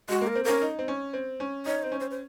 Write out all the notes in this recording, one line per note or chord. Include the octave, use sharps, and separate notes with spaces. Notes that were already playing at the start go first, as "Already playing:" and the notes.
G#3 F#4
A#3
A#4
C4
C#4 A#4
D#4
C4
C#4
C4
C#4
D#4 C#5
C4 C5
C#4
C5
C5